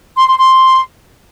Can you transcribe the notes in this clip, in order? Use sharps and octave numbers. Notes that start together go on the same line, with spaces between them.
C6
C6
C6